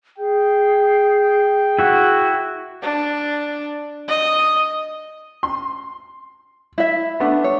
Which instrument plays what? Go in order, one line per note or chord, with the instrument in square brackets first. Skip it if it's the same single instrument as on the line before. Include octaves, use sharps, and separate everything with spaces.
[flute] G#4 [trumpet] G5
[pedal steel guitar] E4 F#4
[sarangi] D4
D#5
[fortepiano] C6
[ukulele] E4 E5
[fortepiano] A3 B3 D4
[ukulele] C#5